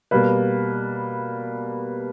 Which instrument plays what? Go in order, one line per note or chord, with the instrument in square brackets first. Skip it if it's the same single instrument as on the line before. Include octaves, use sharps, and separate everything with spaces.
[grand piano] B2 G3 A#3 B4